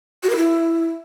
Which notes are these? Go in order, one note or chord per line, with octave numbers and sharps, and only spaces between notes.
F#4
A#4
E4